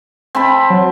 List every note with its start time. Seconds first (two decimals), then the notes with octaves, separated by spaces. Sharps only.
0.35 C4 A5 B5
0.70 F#3